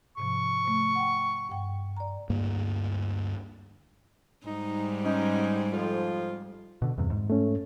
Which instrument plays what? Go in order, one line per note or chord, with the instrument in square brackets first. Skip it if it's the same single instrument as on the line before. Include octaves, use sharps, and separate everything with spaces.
[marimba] G#2 C3 F3 [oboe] C#6
[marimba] C3 A3
F#5 G5
G2 F#5 G5
D5 A#5
[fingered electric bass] D2 G2 A#3
[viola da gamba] G#2 G3 [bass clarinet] D#4
[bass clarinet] C#4 [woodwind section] D#4
[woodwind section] F2 F3 [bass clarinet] F4
[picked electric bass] B2 D3
E2 G2 C3
G#2
[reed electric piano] A3 C#4